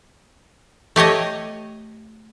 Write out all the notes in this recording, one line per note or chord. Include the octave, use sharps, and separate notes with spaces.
A3 G4 C#5 D#5